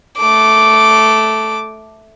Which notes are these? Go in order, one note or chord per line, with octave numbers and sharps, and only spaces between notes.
A3 D6